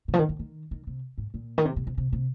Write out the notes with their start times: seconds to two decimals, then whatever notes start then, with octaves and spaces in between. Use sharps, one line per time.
0.08 C3
0.14 F3
0.19 D#3
0.29 D#3
0.39 D#3
0.71 D#3
0.87 C3
1.18 G#2
1.34 A#2
1.58 D#3
1.65 C3
1.76 C3
1.87 C3
1.98 C3
2.13 C3